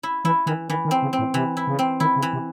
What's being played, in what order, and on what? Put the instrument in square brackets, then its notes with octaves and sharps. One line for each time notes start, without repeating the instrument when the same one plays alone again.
[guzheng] E4
[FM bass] E3 [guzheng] E4
[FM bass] D#3 [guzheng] E3
[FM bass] D#3 [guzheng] E3
[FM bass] D#3
[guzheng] C4
[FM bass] C#3
[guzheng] C4
[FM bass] A2
[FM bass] C3 [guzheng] E3
[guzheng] E4
[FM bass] C#3
[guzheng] C4
[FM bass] D#3 [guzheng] E4
[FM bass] C#3
[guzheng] E3
[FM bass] C3